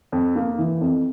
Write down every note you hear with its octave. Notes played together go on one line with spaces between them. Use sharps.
F2
A#3
E3
F2